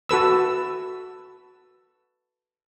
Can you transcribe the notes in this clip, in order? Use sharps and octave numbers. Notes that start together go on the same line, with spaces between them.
F#4 A4 B4 E6